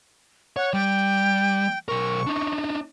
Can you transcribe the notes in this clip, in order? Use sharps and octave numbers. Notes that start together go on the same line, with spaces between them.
C#5 F#5
G3 G5
B1 A#4 C#6
D4 D#4